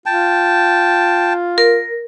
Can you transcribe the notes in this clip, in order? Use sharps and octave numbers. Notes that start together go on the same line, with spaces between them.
F4 G5 A5
A#4